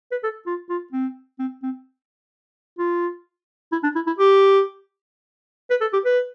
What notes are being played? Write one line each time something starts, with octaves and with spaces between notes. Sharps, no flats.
B4
A4
F4
F4
C4
C4
C4
F4
E4
D4
E4
E4
G4
B4
A4
G4
B4